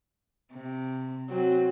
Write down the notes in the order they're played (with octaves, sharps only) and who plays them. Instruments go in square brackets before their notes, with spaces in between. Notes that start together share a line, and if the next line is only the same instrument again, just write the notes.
[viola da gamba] C3
[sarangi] F#3 [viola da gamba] C4